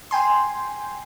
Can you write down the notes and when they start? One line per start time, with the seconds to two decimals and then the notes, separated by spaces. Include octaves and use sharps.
0.11 G5 G#5 C6